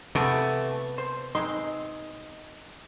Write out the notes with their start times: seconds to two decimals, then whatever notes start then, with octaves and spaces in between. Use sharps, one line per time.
0.15 C3 E3 A3 B3
0.98 C5
1.35 G#3 C4 D#4 C6